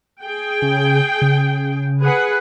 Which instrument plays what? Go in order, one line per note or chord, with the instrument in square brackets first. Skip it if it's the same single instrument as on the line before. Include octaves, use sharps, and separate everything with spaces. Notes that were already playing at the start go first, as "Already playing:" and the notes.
[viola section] G#4 G5
[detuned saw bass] C#3
C#3
[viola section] G#4 B4 F#5